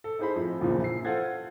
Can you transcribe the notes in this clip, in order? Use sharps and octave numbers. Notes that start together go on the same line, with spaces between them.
A4
D#4 E4 G#4 C5 D#5 B5
F2 A2 F3 E4
A#1 E2 A#2 C#3 F3
E4 C7
F4 A4 C5 F#5 G#6 A6